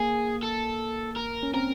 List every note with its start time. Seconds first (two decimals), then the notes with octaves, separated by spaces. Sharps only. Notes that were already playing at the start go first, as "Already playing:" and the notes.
Already playing: A#3 G#4
0.43 A4
1.17 A#4
1.43 C#4
1.54 C4 A#4